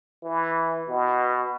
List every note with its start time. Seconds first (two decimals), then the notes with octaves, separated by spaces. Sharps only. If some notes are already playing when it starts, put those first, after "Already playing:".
0.24 E3
0.89 B2